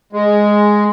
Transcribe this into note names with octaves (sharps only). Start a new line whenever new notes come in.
G#3